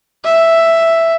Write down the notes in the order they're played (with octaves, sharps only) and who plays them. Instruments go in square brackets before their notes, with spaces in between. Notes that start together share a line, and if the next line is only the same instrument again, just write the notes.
[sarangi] E5